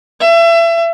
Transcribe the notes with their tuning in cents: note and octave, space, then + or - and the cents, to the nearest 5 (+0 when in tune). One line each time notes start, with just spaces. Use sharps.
E5 +30